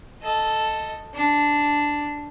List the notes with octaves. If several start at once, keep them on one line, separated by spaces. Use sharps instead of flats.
A4 D#5
D4